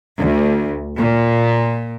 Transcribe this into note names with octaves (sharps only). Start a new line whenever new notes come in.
D2
A#2